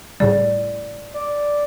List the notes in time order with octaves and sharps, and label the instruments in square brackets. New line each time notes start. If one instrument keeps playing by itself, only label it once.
[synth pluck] A2 C#3 G3 [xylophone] D5
[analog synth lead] D5